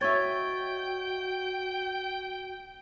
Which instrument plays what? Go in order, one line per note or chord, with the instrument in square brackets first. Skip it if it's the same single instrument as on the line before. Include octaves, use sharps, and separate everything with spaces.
[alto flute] F#4 [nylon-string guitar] C#5 D#5 E5 [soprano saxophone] G5 [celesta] C#6 G#6 A6